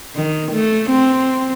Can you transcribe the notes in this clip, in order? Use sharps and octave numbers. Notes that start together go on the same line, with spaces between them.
D#3
A3
C4